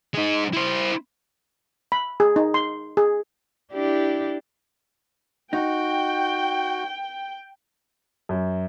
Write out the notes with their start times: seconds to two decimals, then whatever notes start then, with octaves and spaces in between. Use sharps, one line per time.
0.14 G#3 D#4
0.53 E4 C5
1.92 B5
2.20 G#4
2.36 D#4
2.54 C6
2.97 G#4
3.73 D4 E4 G4
5.53 D#4 F#4 G5
8.29 F#2